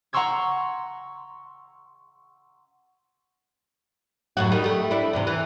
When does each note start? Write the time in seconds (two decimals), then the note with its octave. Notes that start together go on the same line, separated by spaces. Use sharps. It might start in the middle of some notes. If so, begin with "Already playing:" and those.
0.13 F#5 A#5 C6 C#6 E6 G#6
4.37 F#2 A2 F#4
4.52 D#3 G3
4.64 G3 A3
4.91 D4 E4
5.13 E2 G2 C3
5.27 E3